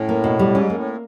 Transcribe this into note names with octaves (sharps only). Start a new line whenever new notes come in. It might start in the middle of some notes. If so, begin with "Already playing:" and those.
Already playing: A2 C#4
A#3
B2
G3
G#2 C#4
A2 A#3